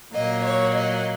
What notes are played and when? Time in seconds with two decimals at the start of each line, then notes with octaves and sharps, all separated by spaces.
0.13 A#2 F#3 A#3 D#5
0.42 C#5
0.72 D#5